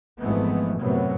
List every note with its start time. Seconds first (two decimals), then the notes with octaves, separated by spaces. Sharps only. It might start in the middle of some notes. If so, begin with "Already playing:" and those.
0.20 G#1 F2 E3 G#3 A3 B3
0.79 F#2 A2 C3 F#3 B3